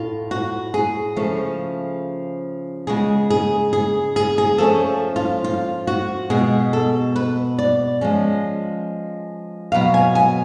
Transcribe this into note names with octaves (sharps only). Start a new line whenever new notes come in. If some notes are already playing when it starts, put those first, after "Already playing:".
Already playing: A2 F4
F#4
G#4
C#3 F3 A3 C#4
C#3 G#3 B3 G#4
G#4
G#4
G#4
G#4
F3 A3 C#4 A4
F4
F4
F#4
B2 G#3 B3 G#4
A4
B4
D5
F3 G#3 C#4
B2 F#3 B3 F5
G#5
G#5